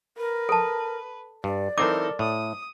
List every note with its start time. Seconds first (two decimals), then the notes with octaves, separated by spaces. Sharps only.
0.17 A#4 B4
0.49 A4 A5
1.44 G2 D5
1.78 E3 C4 D#4 A4 A#4 D6
2.19 A2 D#6